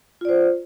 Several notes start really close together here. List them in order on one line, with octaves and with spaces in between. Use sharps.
F4 D5 C5